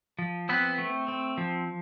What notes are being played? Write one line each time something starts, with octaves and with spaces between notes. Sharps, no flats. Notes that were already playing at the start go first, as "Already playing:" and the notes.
F3
B3 C4 B4
A3
C4
F3